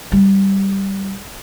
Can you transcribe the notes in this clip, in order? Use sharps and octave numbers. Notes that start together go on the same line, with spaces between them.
G3